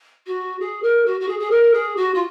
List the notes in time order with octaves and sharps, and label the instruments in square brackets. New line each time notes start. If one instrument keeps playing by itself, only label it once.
[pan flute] F#4
G#4
A#4
F#4
F#4
G#4
G#4
A#4
G#4
F#4
F4